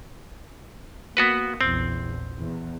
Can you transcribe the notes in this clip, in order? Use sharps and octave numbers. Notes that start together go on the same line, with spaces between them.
A#3 B3 F#4 B4
A#1 E2 C4
E2